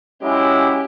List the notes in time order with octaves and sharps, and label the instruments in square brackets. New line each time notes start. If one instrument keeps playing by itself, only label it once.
[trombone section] F#3 G#3 E4 [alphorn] C#4 [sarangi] G4